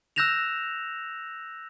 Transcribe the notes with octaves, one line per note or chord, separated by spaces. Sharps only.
E6 F#6 G6 A#6 E7 F7